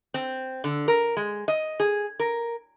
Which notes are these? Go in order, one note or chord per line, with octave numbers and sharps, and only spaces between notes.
C4
D3
A#4
G#3
D#5
G#4
A#4